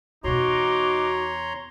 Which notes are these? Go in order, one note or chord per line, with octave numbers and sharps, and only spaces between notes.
E2 B2 D#4 F#4 C#5 A#5 C6 D6